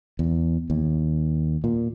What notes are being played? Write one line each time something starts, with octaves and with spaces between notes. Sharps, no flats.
E2
D#2
A#2